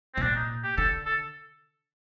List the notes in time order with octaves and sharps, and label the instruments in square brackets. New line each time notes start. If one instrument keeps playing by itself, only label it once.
[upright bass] C3 [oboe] C4
[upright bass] A#2 [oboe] D4
[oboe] D#4
G4
[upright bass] D3 [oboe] A4
[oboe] A4